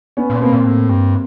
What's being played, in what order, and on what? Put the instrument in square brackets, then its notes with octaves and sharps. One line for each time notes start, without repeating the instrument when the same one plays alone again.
[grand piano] B3 C#4
[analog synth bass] A#2
[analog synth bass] B2 [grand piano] A#3 C4
[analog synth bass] A#2
A2
G2